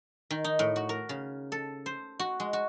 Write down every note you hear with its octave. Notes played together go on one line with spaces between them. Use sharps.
D#3
D#4
A2
F#4
A#4
C#3
A4
C5
F#4
G#3
F#4